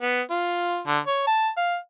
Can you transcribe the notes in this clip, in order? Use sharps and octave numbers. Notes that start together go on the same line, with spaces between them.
B3
F4
D3
C#5
A5
F5